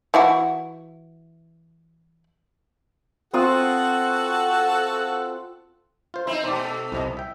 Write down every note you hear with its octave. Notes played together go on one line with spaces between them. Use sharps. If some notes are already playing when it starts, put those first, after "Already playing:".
E3 E4 F#4
C4 F4 F#4 A4 F#5 D#6
F4 C5
C4 D#4 E4
B2 A3 C5 D5
A4
C2 C3 D#5
E5 G5